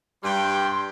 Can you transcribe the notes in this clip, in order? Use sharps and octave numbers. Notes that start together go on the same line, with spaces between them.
G2 G3 G5 C6